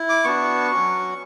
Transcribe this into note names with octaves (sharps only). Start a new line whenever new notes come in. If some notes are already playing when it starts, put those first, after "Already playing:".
Already playing: E4
D6
B3 D4 F#4 C#6
F#3 C#4 F#4